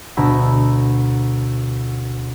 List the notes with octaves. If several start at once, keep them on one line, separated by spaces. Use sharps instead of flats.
D2 B2 A#5 B5 E6